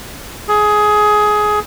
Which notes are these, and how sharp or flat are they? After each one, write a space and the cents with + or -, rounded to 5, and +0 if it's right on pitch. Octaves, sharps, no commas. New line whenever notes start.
G#4 +15